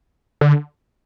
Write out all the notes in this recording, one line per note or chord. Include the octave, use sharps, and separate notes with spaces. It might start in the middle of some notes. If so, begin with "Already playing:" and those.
D3